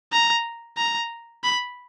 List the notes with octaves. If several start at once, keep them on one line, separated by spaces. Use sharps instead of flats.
A#5
A#5
B5